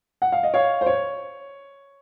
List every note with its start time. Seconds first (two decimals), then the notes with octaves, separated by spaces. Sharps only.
0.22 F#5
0.32 F5
0.43 D#5
0.54 C#5 F5
0.81 C5
0.86 C#5